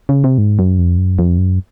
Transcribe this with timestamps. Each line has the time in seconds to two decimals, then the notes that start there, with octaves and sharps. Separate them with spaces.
0.09 C#3
0.24 C3
0.38 G#2
0.59 F#2
0.79 F2
0.98 F#2
1.19 F2
1.38 F#2